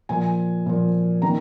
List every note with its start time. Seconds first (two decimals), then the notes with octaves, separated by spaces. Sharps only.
0.09 A#2 F3 G#5
0.66 A#2 F3
1.22 D#3 A#5